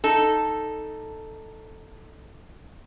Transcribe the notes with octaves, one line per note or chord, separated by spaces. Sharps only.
D#4 A4